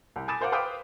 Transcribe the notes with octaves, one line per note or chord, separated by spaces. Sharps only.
C2
G#5 B5 D6 D#6 A6 E7
A#4 C5 F5 F#5 D6
B4 C5 F5 G5 D6 D#6